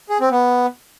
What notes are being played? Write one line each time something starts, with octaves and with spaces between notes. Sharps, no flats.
G#4
C4
B3